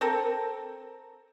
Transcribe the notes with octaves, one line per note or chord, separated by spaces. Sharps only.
C4 A4 A#4